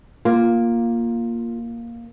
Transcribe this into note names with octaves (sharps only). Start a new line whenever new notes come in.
A#3 F4